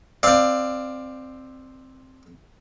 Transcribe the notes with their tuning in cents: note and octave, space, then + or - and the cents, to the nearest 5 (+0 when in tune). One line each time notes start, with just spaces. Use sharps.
C4 +0 D5 +20 F5 +0